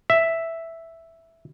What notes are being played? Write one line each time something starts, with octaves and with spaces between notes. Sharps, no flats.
E5